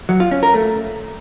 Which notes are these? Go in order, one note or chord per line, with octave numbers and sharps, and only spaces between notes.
F#3
F4
C#4
A#4
A3